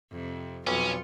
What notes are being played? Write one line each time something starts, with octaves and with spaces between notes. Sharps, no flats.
F2 C3
B1 F2 C#4 F4